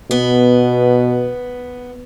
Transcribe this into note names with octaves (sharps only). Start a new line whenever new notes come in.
B2 B3